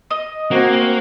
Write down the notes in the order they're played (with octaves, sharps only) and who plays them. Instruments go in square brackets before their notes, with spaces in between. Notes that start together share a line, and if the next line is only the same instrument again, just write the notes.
[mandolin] D#5
[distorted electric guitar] A#3 [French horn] C4 [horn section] F#4